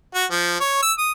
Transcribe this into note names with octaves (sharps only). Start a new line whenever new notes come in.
F#4
F3
C#5
E6
D#6